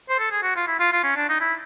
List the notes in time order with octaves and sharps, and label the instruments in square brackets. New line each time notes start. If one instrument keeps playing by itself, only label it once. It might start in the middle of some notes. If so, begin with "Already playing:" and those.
[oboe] C5
A4
G#4
F#4
F4
E4
F4
F4
C#4
D4
D#4
E4